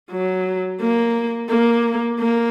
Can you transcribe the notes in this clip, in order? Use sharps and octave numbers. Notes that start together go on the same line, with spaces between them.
F#3
A#3
A#3
A#3